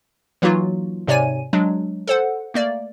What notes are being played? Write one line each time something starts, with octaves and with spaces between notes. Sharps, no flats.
E3 F#3 A#3 D#4 F4 F#4
G#2 C3 C#5 D5 G#5 D#7
F#3 G#3 D4
A4 C5 F#5
A3 A#3 D5